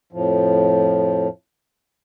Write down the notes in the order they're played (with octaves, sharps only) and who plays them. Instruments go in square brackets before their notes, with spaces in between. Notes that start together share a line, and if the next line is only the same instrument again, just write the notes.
[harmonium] F2 A2 F3